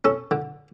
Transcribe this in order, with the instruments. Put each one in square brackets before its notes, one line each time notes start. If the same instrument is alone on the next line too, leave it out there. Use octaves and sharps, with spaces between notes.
[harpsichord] C#4 A4
D3